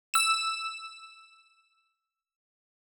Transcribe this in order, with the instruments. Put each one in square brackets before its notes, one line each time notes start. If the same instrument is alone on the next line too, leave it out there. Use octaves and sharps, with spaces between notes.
[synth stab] E6 E7